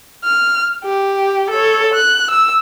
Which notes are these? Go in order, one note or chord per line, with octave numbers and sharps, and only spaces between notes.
F6
G4
A4 C#5
F#6
E6